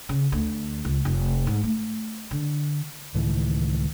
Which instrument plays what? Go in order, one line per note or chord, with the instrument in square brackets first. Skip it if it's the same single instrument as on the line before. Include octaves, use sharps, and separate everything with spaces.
[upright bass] C#3
D2
C#2
F1
G#2
A3
D3
[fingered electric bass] C#2 A2 D#3 E3